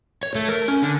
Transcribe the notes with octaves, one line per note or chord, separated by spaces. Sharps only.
C#5
A3
A#4
C#4
D3